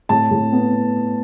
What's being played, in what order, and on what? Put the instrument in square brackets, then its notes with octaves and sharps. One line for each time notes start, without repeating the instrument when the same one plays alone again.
[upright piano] A2 A5
A2
B3